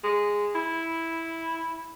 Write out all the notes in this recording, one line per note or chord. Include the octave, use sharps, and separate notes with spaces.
G#3
E4